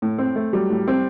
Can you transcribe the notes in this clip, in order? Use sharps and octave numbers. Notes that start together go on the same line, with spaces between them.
A2
C4
A3
F#3 G3
A2
C4